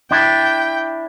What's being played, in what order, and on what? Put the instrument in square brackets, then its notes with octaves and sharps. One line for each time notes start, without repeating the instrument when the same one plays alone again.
[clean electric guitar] D4 E4 [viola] G5